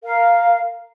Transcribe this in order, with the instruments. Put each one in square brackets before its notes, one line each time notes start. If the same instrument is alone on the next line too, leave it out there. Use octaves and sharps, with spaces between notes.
[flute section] A#4 F5